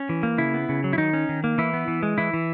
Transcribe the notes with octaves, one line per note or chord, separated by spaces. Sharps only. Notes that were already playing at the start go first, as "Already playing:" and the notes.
Already playing: C#4
E3
A#3
C#3 E4
B3
C#3
F#3
E4
D#3 D#4
C#4
D#3
A#3
E3 E4
B3
E3
G#3
E3 E4
E3